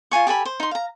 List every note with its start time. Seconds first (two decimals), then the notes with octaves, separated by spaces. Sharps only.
0.11 F4 G#4 G#5 C#6
0.27 G4 A4 G#5 B5
0.45 C5
0.60 D#4 C6
0.71 F5 A#5